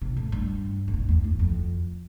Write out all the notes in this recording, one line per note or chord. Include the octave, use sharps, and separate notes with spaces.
C3
A2
G2
A2
G2
E2
E2
F2